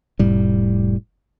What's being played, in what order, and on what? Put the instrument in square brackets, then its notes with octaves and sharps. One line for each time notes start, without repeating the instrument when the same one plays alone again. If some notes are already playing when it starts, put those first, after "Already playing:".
[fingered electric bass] F1 A2 G3